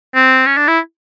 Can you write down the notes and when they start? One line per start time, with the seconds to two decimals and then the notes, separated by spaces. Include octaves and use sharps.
0.15 C4
0.46 C#4
0.57 D4
0.67 E4